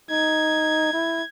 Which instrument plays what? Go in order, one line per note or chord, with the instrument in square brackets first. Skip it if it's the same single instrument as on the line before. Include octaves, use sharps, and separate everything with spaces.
[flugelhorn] D#4 [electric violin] G#6
[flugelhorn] E4